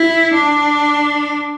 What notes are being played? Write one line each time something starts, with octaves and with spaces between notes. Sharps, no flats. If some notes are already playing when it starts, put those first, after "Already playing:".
Already playing: E4
D4